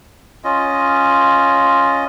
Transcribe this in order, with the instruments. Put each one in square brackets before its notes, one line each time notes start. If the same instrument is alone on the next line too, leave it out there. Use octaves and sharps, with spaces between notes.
[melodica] C#4 F4 D#5